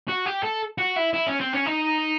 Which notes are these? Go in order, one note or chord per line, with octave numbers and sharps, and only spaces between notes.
F#4
G4
A4
F#4
E4
E4
C#4
C4
C#4
D#4